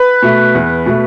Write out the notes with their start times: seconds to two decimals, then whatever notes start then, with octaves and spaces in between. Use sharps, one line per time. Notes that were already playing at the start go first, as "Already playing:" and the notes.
Already playing: B4
0.22 B2 A3
0.55 E2
0.86 B2 A3